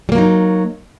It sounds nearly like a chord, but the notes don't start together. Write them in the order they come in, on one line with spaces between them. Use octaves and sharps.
G3 A#3 F#3 D#4